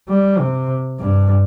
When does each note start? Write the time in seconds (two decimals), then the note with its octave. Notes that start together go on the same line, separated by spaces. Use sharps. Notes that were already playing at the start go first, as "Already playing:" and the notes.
0.09 G3
0.38 C3
0.99 G2